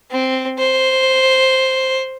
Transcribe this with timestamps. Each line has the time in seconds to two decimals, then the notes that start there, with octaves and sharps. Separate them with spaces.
0.11 C4
0.58 C5